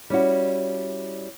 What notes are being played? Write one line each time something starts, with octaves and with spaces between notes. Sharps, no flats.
G3 C#4 E4 F#4